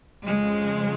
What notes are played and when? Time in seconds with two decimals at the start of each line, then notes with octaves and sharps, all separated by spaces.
0.25 F2 C#3 F3 G#3